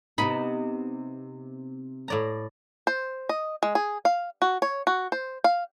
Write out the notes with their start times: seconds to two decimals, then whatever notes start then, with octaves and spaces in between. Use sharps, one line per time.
0.18 C3 B3 D#4 B5
2.08 A2 D5 A#5
2.87 C5
3.29 D#5
3.63 G#3
3.75 G#4
4.05 F5
4.42 F#4
4.62 C#5
4.87 F#4
5.12 C5
5.44 F5